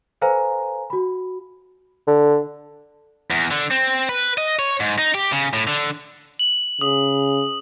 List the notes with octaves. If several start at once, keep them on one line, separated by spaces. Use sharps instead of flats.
A4 B4 C5 F5 G#5 A#5
F#4 B5
D3
E2
D3
C4
B4
D#5
C#5
G#2
D#4
G4
C#3
A2
D3
F#7
C#3 D#6